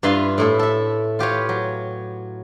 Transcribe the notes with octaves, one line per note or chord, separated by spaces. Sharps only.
G2 E4 F4 B4 F5 C6
A2 E4 A4
A4 E5
F4 G4 B4 C#5
F#3